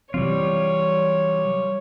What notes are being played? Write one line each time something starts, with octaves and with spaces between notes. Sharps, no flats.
C3 E3 F#3 G3 C4 F4 C#5